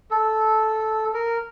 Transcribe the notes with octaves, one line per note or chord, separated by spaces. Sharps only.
A4
A#4